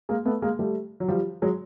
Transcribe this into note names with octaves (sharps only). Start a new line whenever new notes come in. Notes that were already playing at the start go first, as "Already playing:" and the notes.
G#3 A#3
A3 B3
G#3 A#3
G3 A3
F#3
F3 G3
F#3 G#3